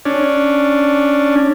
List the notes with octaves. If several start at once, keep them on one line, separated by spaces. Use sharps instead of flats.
C#4 D4